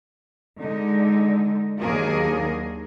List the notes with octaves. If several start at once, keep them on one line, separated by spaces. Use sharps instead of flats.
D3 G#3 D#4
D#2 F#3 A#3 D4 G#4 A#4